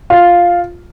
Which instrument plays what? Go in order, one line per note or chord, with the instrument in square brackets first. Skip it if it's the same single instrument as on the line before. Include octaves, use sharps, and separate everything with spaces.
[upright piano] F4